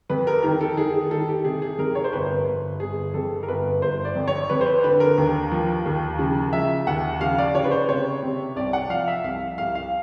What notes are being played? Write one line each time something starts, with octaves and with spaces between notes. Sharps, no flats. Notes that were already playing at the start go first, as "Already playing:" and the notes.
F2 B4
A#4
D#3 A#4
A4
D#3 G#4
G#4
D#3 A4
G4
C3 G#4
G#4
F2 A#4
C#5
C5
G1 B4
G1
G1 G#4
F2 A4
A#4
G1 B4
G1 C5
D5
F2
C#5
F2 B4
C5
B4
D3 B4
A#4
D#2
F3
D#2
C#3
F3 E5
D#2 F#5
C#3 F5
D5
C#3 C#5
B4
C5
C3 C#5
C3
C2 D5
F#5
F3 F5
E5
C2 F5
C2 F5
F5